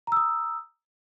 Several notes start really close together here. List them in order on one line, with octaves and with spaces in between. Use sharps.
A#5 E6 D#6